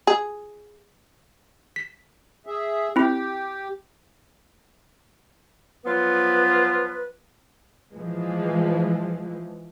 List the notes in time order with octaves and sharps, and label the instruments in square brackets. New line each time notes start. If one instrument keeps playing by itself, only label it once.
[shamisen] G#4
[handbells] B6
[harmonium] G#4 E5
[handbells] C4 E4 [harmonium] G4
[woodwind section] F3 F#3 B3 F4 B4
[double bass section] E3 F3 G#3